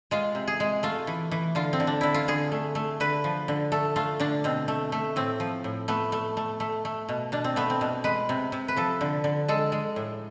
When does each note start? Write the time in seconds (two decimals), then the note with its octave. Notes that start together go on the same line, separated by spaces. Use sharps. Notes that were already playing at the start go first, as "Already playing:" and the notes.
0.11 G#3 F4
0.35 C3
0.47 G#4
0.60 G#3
0.83 A3 F4
1.07 E3
1.31 E3
1.55 D3 F4
1.73 C4
1.80 D3
1.87 D4
2.01 D3 E4
2.14 F4
2.28 D3 G#4
2.52 A3
2.75 A3
3.00 D3 B4
3.24 F3
3.48 D3
3.72 A3 A4
3.96 A3 F4
4.20 D3 D4
4.44 B2 C4
4.68 A3
4.92 A3
5.16 A2 C4
5.40 F3
5.64 A2
5.88 A3 B3
6.12 A3
6.37 A3
6.60 A3
6.85 A3
7.09 B2
7.32 B2 D4
7.44 C4
7.56 A3 B3
7.70 C4
7.81 B2
8.04 G#3 B4
8.29 C3
8.52 C3
8.68 B4
8.76 F3 A4
9.01 D3
9.24 D3
9.48 G#3 A4
9.72 G#3
9.96 A2